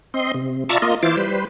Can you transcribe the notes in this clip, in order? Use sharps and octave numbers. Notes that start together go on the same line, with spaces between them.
C4 D#5 C6
C3
F4 D5 E5 A5 A#5 C#6
A#3 F4 D#5
E3 E4 F4 C5 D6
G3 B4 C5